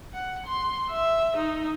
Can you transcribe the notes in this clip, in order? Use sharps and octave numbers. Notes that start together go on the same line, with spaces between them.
F#5
C6
E5
D#4